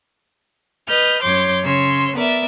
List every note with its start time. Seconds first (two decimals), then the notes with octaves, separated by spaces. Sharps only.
0.88 B4 D#5 F6 G6
1.23 F#2 C#5 C6 D6 G6
1.64 C#3 C#5 C6 E6
2.15 B3 A#4 D5 E5